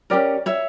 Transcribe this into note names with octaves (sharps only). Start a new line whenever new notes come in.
C#4 G4 A#4 D5
C#5 E5